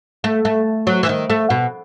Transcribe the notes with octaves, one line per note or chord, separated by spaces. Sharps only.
A3
A3
F#3
E3
D#3
A3
B2